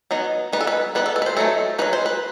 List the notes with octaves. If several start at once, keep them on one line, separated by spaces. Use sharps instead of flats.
F#3 B3 D#4
G3 B3 D#4 B4
A4
B4
G3 B3 D#4 B4
A4
A4
B4
C5
F#3 A3 D#4 A4
F#3 A3 D#4 B4
C5
B4